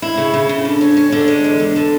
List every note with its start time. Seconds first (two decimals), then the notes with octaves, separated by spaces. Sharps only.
0.02 E4
0.17 C#3
0.34 C#3
0.49 C#3
0.65 D3
0.81 C#4
0.97 C#4
1.12 D3
1.28 G#3
1.44 E2
1.60 D3
1.76 D3